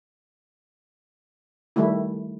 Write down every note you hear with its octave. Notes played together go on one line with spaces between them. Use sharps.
D#3 G3 A3 E4